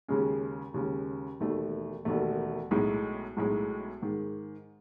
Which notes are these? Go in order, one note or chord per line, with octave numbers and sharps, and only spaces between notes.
D#2 C#3 G#3 C#4
D#2 C#3 G#3 C#4
E1 D#2 D#3 A3
E1 D#2 D#3 A3
B1 A2 G#3 D#4
B1 A2 G#3 D#4
G#2 D#3 G#3